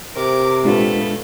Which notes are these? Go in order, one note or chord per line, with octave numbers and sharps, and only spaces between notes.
C3 A#4 D6
A#2 G#3 A3 B3 D4 F4